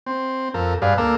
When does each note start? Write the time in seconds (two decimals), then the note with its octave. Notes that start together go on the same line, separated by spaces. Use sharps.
0.06 C4
0.54 F2 A4 A#4
0.82 G2 G#4 B4 D5 F5
0.98 D2 A#3 A4 A#4 D6 E6